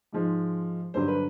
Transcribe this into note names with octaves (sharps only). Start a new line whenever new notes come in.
G#2 F3 G#3
G2 D3 F#3 C5
B4